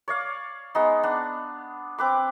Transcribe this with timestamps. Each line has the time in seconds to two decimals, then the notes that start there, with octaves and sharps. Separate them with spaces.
0.08 C#5 D5 F5
0.75 G#3 B3 D#4
1.03 B3 D4 D#6
1.98 C4 B4 D6